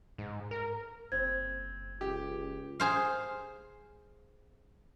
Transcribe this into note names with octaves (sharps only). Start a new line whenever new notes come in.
G#2
A#4
F#1 C4 G#6
C#2 G4
G#4 C5 F5